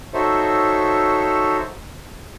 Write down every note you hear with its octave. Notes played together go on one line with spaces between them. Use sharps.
D#4 F#4 A4 C5 C#5 E5